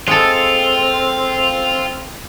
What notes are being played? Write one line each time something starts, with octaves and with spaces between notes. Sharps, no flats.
G#3 C4 F4 A4